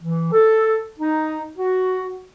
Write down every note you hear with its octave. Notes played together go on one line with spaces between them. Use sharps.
E3
A4
D#4
F#4